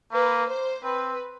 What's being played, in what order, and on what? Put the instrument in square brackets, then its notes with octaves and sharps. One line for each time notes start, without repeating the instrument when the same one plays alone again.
[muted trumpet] A#3 [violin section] B4
[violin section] C5
[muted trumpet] C4 [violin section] B4